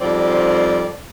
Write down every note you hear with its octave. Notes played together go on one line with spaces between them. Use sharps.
F2 G#2 F3 G3 C4 D5